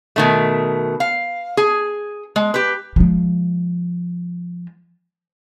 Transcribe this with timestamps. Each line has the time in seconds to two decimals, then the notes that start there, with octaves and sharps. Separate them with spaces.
0.16 B2 D#3 A3
1.00 F5
1.57 G#4
2.36 G#3
2.54 G4 B4
2.96 F3 G#3